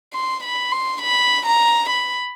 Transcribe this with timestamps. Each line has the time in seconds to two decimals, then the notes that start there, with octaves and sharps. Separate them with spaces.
0.14 C6
0.44 B5
0.72 C6
1.02 B5
1.46 A#5
1.89 B5